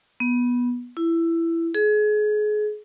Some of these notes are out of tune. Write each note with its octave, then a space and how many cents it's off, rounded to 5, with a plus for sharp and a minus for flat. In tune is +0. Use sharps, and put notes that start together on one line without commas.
B3 -15
E4 +15
G#4 +30